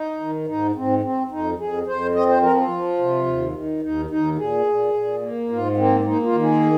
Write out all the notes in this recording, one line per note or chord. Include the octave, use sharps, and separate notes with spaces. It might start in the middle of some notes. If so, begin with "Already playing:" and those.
Already playing: D#4
D#3
G#2 D#4
G#2 C4
C4
F2 D#4
F2 G#4
F2 C5
C4 D#5
C5
F3 A#4
F4
F3
C3
D#2
D#3
D#2 D#4
D#2 D#4
A#2 G#4
A#2
A#2
A#3
G#2 F4
A#3 C4
C4
A#3 D#4
F4
D#3
G#4